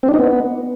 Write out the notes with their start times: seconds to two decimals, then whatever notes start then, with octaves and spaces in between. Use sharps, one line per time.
0.03 C4
0.08 D4
0.14 D#4
0.19 B3